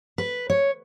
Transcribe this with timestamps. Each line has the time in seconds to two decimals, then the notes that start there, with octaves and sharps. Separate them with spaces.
0.18 B4
0.50 C#5